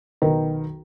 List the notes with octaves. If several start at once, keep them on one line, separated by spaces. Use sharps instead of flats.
B1 D#3 A#4 B4